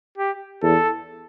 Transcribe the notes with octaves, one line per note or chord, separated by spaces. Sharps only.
G4
E2 A4